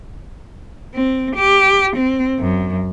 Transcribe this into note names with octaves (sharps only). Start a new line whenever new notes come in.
C4
G4
C4
F#2